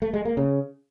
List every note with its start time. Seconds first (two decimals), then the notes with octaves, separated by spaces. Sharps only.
0.02 A3
0.14 G#3
0.25 A#3
0.37 C#3